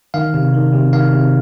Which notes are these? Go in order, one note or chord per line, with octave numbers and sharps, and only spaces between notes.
D#3 F5
C3
D#3
C3
D#3 F5
C3